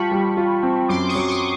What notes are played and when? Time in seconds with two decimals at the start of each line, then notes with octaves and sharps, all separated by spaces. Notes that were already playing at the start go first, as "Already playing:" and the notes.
Already playing: G3 F4 G5 A5 B5 C#6
0.11 G3
0.37 F4
0.63 C4
0.89 F#2 C6 D6
1.08 C#6 D#6
1.15 F#3
1.28 C6 D6